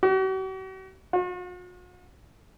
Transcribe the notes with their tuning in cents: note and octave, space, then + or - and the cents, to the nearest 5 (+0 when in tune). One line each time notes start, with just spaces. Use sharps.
F#4 +45
F#4 -45